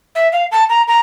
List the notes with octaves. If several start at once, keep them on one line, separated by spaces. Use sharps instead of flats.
E5
F5
A5
A#5
A#5